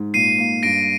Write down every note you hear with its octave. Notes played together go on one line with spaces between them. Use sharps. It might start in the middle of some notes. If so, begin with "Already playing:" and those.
Already playing: G#2
A#2 C7 D#7
A#3
G2 A#6 D7